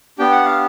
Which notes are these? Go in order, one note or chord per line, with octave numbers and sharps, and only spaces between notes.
B3 D4 G4 G5
F#5
F5